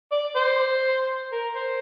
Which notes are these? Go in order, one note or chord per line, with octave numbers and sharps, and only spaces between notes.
D5
C5
A#4
C5